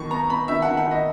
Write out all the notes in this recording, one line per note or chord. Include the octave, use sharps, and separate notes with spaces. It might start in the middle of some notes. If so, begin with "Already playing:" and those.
Already playing: D#3 F#3 B3 C#6
B3 A#5
B3 B5
D#3 E5
F#5
D#3
F#5
D#3 D#5